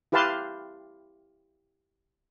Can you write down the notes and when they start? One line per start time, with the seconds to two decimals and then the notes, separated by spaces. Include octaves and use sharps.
0.12 E4 G4 B4 F5 A5 C6